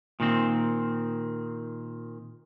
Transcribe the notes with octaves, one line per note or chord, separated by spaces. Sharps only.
A#2 D#3 C4